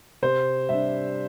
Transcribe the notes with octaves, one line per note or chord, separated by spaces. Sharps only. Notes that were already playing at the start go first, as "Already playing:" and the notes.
C3 C5
G3 D4 E5